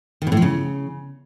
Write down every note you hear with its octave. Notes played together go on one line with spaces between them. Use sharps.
D#3
B2
A2
F3
C#3